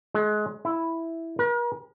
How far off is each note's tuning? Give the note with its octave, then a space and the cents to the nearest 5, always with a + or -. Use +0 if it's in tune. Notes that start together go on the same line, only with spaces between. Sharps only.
G#3 +25
E4 +0
A#4 +45